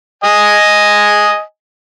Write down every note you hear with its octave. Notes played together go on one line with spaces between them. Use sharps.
D#5 G#5